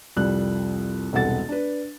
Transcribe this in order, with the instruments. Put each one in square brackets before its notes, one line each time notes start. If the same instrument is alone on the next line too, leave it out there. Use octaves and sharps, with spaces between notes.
[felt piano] C2 F2 G3 F#6
E1 C2 A4 F#5 A6
D4 B4